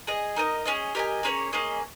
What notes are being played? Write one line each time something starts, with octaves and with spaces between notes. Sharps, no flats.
G#4 D#5 G#5
D#4 A#4 D#5
C#4 G#4 D#5
G4 A#4 D#5 G#5
A#3 C#4 G#4 C#5
A#3 C#4 G#4 D#5